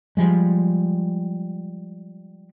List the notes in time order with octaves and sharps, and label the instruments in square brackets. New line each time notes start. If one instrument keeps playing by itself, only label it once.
[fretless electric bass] F3 G3 G#3